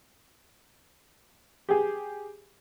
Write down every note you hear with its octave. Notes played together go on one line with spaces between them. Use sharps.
G4 G#4